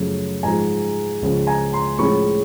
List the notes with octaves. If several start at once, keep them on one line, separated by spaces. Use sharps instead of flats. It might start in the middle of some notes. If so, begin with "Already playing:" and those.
Already playing: F#2 C#3 F3 A3
G#2 F3 G#3 G#5 A#5
C#2 C#3 F3
G#5 A#5
A#5 C6
A2 F3 G#3 C#4 B5 C#6